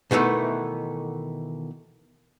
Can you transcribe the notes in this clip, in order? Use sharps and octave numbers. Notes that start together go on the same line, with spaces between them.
B2 D#3 E3 A3 B3